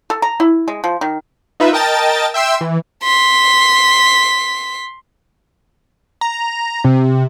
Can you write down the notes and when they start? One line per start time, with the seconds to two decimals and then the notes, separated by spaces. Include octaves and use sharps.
0.10 A4
0.22 A#5
0.40 E4
0.68 G#3
0.84 F3
1.01 D#3
1.60 D#4 F4 B4 E5
1.73 A#4 D#5 G5 A5 A6
2.34 E5 G5 C6 E6
2.61 E3
3.04 C6 B6
6.21 A#5
6.84 C3